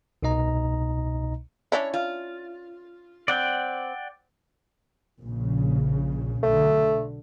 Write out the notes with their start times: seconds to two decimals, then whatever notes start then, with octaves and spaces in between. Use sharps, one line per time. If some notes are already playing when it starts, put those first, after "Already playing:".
0.22 C2 B2 D#4 D#5 A#5
1.72 C#4 D4 E4 C#5
1.94 F4
3.28 C4 D5 F#5 G5
5.21 A#1 C#3
6.43 B1 D3 A3